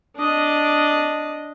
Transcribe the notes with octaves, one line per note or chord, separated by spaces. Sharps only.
D4 D#5